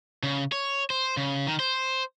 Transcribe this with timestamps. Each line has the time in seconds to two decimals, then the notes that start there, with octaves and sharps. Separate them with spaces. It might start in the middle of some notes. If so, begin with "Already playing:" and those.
0.23 C#3
0.52 C#5
0.90 C5
1.17 C#3
1.47 D#3
1.60 C5